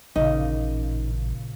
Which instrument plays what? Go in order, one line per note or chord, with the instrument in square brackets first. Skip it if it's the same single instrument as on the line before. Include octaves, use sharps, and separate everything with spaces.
[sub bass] A1 [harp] A#2 C#3 [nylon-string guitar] D#4